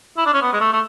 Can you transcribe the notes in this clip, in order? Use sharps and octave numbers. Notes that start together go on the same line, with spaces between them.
E4
D4
C#4
B3
G#3
A3
A3